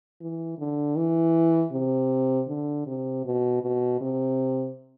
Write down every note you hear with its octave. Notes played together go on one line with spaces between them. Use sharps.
E3
D3
E3
C3
D3
C3
B2
B2
C3